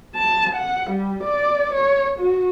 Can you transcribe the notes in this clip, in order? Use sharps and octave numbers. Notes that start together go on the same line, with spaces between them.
A5
F#5
G3
D5
C#5
F#4